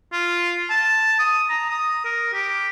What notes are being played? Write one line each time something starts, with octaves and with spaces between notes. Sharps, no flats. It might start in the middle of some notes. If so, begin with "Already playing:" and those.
F4
A5
D#6
A#5
D#6
A#4
G4